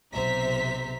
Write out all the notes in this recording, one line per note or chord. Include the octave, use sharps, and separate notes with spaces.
B1 C3 C5 E5 A#5 B6